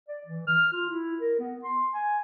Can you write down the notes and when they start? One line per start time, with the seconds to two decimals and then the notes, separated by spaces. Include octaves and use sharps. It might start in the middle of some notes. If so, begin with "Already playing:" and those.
0.09 D5
0.27 E3
0.47 F6
0.72 F4
0.90 E4
1.20 A#4
1.39 B3
1.64 C6
1.93 G#5